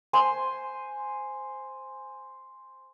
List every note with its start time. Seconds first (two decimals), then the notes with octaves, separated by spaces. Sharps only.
0.13 C5 G#5 C6